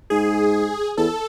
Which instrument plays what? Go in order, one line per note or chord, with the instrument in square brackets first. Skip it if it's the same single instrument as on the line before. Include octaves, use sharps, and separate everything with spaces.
[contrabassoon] G#2 [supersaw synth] G#4
[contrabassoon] E2 [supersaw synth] A4